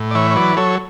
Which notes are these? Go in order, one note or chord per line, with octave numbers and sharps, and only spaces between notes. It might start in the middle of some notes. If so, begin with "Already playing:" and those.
Already playing: A2
D5
E3 C#5 E5
C#5
F#3 B4 D5
F#3 A4 C#5